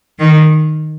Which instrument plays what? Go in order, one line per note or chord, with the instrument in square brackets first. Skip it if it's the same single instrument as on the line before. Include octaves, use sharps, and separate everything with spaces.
[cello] D#3